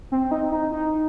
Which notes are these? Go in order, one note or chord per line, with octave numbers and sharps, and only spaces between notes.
C4
D#4
D#4
D#4